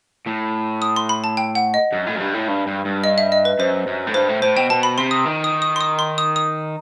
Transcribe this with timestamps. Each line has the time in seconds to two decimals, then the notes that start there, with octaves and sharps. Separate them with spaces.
0.27 A2
0.82 D#6
0.96 C6
1.09 B5
1.24 A5
1.37 G5
1.55 F#5
1.74 D#5
1.93 F#2
2.07 A2
2.16 F#2
2.21 G2
2.34 A2
2.48 G2
2.67 G2
2.85 G2
3.04 D#5
3.18 E5
3.32 D#5
3.45 B4
3.59 F#2 C5
3.87 F#2
4.07 A2
4.14 G2 C5
4.29 A2
4.42 A2 C5
4.56 B2 G5
4.70 B2 A5
4.83 B5
4.98 C3 C6
5.11 D#6
5.26 D#3
5.44 D#6
5.62 D#6
5.76 C6
5.81 D#6
5.99 C6
6.18 D#6
6.36 D#6